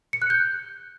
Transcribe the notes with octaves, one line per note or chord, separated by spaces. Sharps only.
C#7
F#6
G6